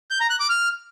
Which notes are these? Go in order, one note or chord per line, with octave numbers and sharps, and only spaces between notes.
G6
A#5
F#6
D6
F6